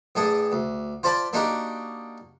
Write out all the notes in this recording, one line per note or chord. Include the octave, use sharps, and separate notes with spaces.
A1 D4 G#4 A4 D#6
D2
F4 C5 D5 A5 B5
A#3 D4 D#4 F#4 G4 A#4